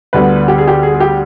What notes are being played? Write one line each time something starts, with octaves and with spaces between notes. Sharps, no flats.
D2 D3 G3 B3 B4
G4
G#4
G4
G#4
G#4
G4